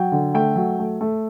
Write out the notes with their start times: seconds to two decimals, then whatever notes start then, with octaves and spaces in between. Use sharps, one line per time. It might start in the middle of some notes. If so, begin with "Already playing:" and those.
Already playing: F#3 G5
0.12 D3
0.34 A3 G5
0.56 F#3
0.79 A3
1.01 A3